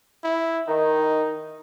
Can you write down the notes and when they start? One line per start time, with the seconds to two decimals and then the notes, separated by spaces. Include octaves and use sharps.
0.24 E4
0.68 D#3 D#4